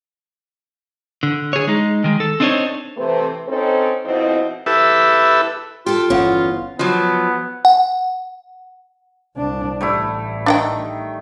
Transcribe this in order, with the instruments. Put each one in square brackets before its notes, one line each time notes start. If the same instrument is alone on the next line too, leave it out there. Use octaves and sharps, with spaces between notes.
[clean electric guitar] D3
G#4 C#5
G#3 D#4
D#3 G#3
A4
C4 D4 D#4 G4 C5 C#5
[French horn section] C3 E3 A3 C4 A4 B4
C4 C#4 D#4 A4 C5
F2 B2 C4 D#4 E4
[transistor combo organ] E4 G4 A4 B4 E5
[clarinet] F4 [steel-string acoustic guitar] G4 A4
[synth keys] G1 F5 F#5 [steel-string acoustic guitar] E2 C#4
[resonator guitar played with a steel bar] F3 F#3 [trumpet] B3
[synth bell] F#5
[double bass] C2 D4
[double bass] A1 [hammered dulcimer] G3 A3 E4
[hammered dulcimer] D#3 [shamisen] D4 F#5 G5